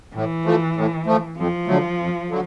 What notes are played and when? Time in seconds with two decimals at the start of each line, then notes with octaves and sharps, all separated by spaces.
0.14 A2 E3
0.45 F3 A3
0.76 A2
1.06 F3 A3
1.37 F2 F3
1.67 D3 F#3 A3
1.99 F2
2.29 D3 F#3